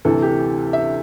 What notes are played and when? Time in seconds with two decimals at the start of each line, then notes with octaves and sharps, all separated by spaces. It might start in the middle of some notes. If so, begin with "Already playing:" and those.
0.05 D2 C3 E3 A4
0.22 G4
0.73 E5